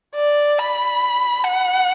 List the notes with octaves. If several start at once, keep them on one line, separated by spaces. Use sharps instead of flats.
D5
B5
F#5